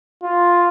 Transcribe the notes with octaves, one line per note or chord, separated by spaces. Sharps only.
F4